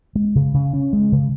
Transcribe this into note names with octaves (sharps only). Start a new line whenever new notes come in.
G#3
C#3
C#3
C#4
G#3
C#3